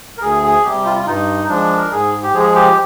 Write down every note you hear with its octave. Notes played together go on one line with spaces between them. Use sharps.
A#4
D2 G#4
G#4
C3 G3 G4
F4
F4
G2 D#4
F3 G#3 D4
A#4
G#2 G#4
G4
F3 G#3 G#4
G4